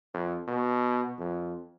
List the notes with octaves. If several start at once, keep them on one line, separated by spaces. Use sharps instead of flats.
F2
B2
F2